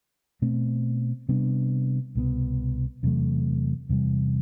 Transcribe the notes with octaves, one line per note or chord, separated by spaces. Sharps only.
B2 A3 C4
C3 G3 B3 D4
C2 B2 G3 B3
E2 C3 F#3 A3
E2 C3 G3